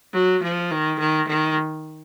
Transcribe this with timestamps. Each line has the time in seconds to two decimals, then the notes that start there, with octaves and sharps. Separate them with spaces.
0.13 F#3
0.43 F3
0.71 D#3
0.99 D#3
1.28 D#3